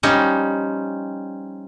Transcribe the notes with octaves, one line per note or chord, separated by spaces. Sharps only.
F3 G3 C#4 D#4